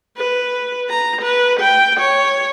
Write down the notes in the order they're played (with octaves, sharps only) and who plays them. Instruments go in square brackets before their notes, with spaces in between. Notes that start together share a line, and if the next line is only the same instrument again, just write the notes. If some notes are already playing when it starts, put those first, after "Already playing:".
[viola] B4
A#5
B4
G5
C#5